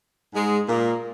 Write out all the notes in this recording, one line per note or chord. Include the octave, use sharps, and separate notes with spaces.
G#2 G#3
A#2 A#3